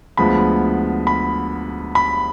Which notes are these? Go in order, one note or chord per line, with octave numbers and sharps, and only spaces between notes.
D2 D3 F3 G#3 B3 B5
B5
B5